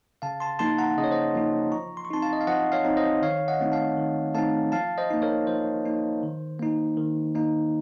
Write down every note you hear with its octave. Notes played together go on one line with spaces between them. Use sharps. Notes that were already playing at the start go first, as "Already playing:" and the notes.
C#3 F5 A5
A5 C6
F3 A#3 D#4 A5 C6
F#5 A#5
C#3 D#5
C#5
C5 D#5
F3 A#3 D#4
F3 A#5 C#6
C6
C#6
C4 D#4 A5 C6
F5 A5
D#5
F5
F3 D#5 F#5
C#5 F5
C4 D#4
C5 D#5
D#3 C#5 F5
D#5 F#5
A3 C4 D#4
F5 A5
D#3
A3 C4 D#4 F5 A5
F3 F5 A5
C5 D#5
A#3 D#4
A#4 C#5
F3 C5
A#3 D#4
D#3
A#3 D#4
D#3
A#3 D#4